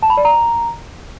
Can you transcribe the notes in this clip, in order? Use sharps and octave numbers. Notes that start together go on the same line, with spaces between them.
A5
B5
D5
A#5